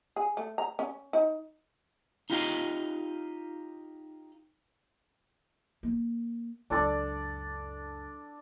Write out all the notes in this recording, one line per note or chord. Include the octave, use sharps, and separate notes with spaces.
G#4
A3
A#5
C#4
D#4
D#4 F4 G4 C5 D#5 F5
A#3
C#2 F#2 D4 A4 D5